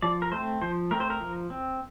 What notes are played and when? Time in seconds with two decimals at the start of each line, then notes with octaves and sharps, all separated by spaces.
0.02 F3 D5
0.22 A#4
0.32 A3 C4 C5
0.61 F3 C5
0.91 A3 C4 A#4
1.00 C5
1.10 A#4
1.20 F3
1.50 C4